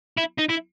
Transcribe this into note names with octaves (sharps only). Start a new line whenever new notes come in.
E4
D#4
E4